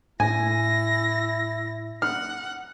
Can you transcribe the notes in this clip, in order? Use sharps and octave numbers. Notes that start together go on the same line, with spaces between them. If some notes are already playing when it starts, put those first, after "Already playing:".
A2 E4 G#5 A#6
F#5 F6